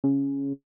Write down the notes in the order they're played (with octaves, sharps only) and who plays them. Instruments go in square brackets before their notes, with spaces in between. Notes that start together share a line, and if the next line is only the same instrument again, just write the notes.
[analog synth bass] C#3